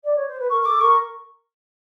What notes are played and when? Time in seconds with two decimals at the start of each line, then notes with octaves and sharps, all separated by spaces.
0.04 D5
0.15 C#5
0.27 C5
0.39 B4
0.50 A#4 C#6
0.61 C#6
0.65 A4 D6
0.81 A#4 C#6